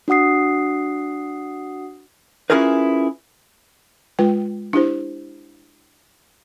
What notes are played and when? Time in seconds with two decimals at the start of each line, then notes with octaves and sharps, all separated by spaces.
0.08 D4 F#4 F#5 D#6 C7
2.50 C#4 E4 F4 G#4 A#4 B4
4.19 G#3 F4 B4 G5
4.73 D4 E4 G4 C5